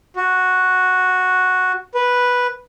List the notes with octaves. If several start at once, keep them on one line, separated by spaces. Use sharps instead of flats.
F#4
B4